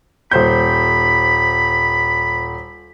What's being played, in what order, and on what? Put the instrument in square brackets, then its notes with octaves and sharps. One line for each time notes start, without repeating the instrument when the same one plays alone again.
[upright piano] D#1 C5 G6 [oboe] B5